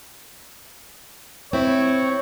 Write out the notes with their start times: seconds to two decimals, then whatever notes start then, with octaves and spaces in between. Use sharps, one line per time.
1.53 C4 E4 C#5